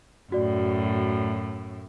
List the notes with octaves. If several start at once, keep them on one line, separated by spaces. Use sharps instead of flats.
F#2 A2 F#4 D5